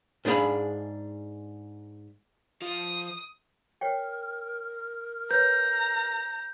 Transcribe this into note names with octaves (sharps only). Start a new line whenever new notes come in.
G#2 D4 G#4 C5 F5 B5
F3 D#6
A#4 C#5 F#5 G5
B4 C#5 A#5 G6